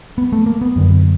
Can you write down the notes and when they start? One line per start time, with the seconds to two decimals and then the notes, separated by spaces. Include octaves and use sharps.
0.18 B3
0.32 A3
0.46 A#3
0.61 B3
0.76 F#2 D3